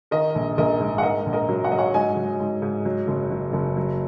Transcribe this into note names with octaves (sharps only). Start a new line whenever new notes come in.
D#3 A#4 D#5
A#1
A#1 A#4 D#5
G#2
F#5
G#2 A#4 D#5
A#1
A#4 D#5
F#3
F#5
F#3 D#5
C#5 F#5
G#2 D#5 G#5
F#3
G#2
G#2
F#3
F#1
F#3
F#1
F#3